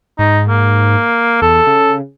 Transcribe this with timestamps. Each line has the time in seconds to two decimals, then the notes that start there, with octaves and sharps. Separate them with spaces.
0.19 G#2 D#4
0.49 A#3
1.42 E2 A4
1.67 C#3